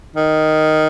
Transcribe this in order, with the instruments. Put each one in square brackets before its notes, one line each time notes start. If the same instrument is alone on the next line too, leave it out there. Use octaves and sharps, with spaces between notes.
[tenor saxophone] D#3